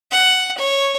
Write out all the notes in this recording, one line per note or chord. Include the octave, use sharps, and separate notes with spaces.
F#5
C#5